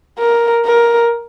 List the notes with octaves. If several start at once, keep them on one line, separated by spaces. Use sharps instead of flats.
A#4
A#4